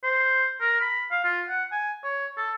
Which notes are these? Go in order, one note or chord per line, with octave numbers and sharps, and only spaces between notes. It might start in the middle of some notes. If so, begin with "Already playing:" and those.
C5
A#4
B5
F5
F4
F#5
G#5
C#5
A4